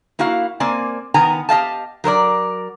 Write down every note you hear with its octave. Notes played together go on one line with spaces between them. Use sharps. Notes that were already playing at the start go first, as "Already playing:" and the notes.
A#3 E4 F#4 F5
A#3 C4 D5 G#5
D#3 B3 G#5 A#5
G4 D#5 F5 A5
F#3 A#4 C5 D5